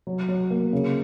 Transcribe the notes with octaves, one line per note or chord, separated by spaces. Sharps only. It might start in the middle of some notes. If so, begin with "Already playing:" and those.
F#3
F#3
A#3
C#3